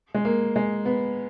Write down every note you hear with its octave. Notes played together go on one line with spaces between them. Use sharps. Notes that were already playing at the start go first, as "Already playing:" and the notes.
G#3
A#3
G#3
B3